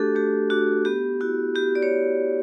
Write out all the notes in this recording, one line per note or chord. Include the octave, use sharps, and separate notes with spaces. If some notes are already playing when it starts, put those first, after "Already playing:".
Already playing: A3 D4 F#4 G4 A4
A3 G4
D4 F#4
B3 G4
E4 F#4
B3 G4
D5
C#5